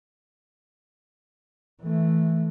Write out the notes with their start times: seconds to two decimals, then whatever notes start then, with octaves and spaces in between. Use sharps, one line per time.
1.82 E3 A3